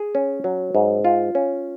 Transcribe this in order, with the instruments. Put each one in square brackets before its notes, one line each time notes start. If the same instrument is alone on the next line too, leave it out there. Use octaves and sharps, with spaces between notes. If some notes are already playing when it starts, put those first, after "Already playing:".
Already playing: [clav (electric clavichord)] G#4
C#4
F#3
G#2
F4
C#4